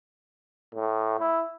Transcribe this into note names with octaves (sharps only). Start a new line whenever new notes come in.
A2
E4